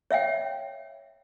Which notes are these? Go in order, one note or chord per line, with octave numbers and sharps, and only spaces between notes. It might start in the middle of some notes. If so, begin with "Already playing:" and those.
C#5 E5 F5 G5